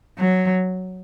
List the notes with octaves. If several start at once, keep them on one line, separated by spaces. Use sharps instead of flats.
F#3